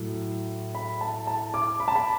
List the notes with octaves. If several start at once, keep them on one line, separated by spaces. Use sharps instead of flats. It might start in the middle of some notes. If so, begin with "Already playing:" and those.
Already playing: A2 F#3 A3
B5
A5
A5
D6
B5
A5
B5